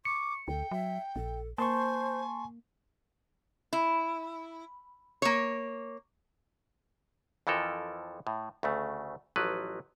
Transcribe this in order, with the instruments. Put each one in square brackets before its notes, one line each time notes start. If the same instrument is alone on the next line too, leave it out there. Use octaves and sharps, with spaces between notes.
[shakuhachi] C#6 [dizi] D6 [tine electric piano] C#7
[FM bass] D2 [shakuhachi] A4 [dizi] G5
[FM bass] F#3 [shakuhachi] E5
[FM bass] A#1 [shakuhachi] A4
[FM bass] A#3 [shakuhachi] C5 [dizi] G#5 [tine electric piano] A5 C6 C#6
[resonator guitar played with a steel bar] E4
A#3 C#5
[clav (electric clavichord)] F2 E3 F3 A4 A#4
A2
D2 C#3 A3
A1 F3 F#3 B4